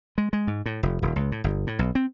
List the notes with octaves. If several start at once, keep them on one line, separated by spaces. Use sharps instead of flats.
G#3
G#3
G#2
A2
F1
D#1
C#2
A2
G1
A2
B1
C4